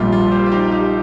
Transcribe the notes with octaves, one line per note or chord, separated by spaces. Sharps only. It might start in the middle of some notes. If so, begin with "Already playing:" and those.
Already playing: A#1 A#2 G3 F4
F4
G4 C5
F4
D#4 G4
D#4 G4